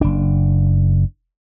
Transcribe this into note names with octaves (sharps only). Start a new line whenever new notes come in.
F#1 D4